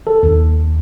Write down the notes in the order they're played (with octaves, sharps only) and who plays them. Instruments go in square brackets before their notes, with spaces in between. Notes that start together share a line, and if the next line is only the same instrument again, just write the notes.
[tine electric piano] A4
D#2